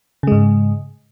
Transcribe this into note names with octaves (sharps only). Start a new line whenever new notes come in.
G#2 C#3 G#3